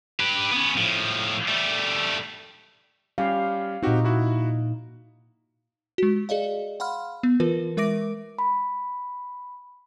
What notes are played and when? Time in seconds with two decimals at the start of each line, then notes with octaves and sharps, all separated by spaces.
0.20 G4 B4
0.52 B3 C#4
0.77 A2 F3
1.48 G3 A3
3.18 G3 C#4 G4 F5
3.83 A#2 C4 D#4 F#4 G4
4.05 E4 F#4
5.98 G#3 F#4
6.29 G#4 D5 D#5 F5
6.80 F5 F#5 B5 C6 F6
7.23 B3
7.40 E3 F4 A#4 B4
7.77 G#3 A#4 E5 D6 A#6 D7
8.39 B5